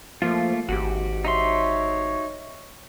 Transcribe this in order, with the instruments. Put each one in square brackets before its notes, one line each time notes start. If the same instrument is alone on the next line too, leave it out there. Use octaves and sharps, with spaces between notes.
[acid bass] F3 [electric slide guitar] A3 A#3 F4
[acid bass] G#1 [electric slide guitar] F#4 G4
[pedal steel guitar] D#4 E5 C6 [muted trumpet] C#5